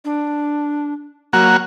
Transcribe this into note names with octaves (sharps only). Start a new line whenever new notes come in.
D4
F#3 A#3 F#4